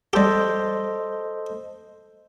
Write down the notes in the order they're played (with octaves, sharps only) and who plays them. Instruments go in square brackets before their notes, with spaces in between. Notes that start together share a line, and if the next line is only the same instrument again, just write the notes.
[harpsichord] G3 G4 [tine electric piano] A4 C5 D#5